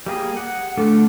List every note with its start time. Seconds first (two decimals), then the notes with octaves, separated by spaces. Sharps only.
0.06 G3 A#3 G#4
0.37 F#5
0.77 D3 A3 D4 F4